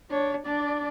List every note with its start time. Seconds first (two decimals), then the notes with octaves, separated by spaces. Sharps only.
0.11 D4 C#5
0.46 D4 D5